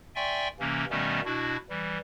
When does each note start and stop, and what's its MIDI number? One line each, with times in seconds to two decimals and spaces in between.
0.16 0.48 74
0.16 0.48 76
0.16 0.48 79
0.16 0.48 80
0.16 0.48 84
0.16 0.48 85
0.60 0.85 48
0.60 0.85 52
0.60 0.85 58
0.60 0.85 61
0.90 1.21 47
0.90 1.21 51
0.90 1.21 55
0.90 1.21 57
0.90 1.21 59
0.90 1.21 61
1.25 1.57 47
1.25 1.57 62
1.25 1.57 64
1.25 1.57 66
1.69 1.98 52
1.69 1.98 55